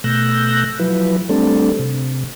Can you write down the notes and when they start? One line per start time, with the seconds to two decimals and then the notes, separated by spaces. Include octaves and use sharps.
0.04 B2 A3 E6 F#6 G6 A#6
0.79 F3 F#3 E4 B4
1.29 G3 A3 C4 D4 A4
1.79 C3